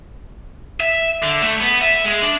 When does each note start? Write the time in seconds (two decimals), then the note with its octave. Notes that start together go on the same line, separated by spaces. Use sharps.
0.80 E5
1.22 D3
1.42 A3
1.60 B3
1.81 E5
2.05 G#3
2.23 D4